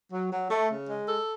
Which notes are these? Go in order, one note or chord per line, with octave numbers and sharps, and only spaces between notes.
F#3
F#3
A3
C#3
G#3
A4